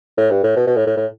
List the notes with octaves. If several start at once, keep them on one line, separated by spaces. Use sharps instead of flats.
A2
G2
A2
B2
B2
A2
A2
A2